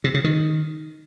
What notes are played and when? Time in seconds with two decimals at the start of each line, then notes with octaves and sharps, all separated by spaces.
0.04 C3
0.14 C#3
0.24 D#3